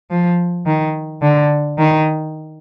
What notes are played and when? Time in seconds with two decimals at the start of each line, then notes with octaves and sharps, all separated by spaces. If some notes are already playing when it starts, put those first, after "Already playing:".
0.10 F3
0.66 D#3
1.22 D3
1.78 D#3